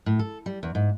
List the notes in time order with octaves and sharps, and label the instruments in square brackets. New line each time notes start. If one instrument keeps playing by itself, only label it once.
[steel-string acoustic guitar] A2
A4
G3
E2
G#2